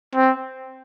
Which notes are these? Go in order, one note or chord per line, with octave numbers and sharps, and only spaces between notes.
C4